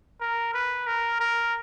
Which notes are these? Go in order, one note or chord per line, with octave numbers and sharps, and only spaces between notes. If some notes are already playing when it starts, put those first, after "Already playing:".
A#4
B4
A#4
A#4